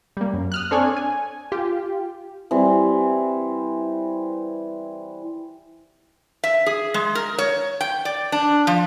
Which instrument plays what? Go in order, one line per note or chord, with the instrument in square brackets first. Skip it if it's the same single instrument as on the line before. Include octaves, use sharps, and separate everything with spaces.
[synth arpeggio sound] G3 A#3
F#2
D#6 F6 F#6
C4 D4 A4 C#5 D5 G#5
G#5
F4 G4
[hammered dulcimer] E3 G3 C4
[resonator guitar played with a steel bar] E5
G#4
G#3
A#4
C#5
G5
D5
D4
F3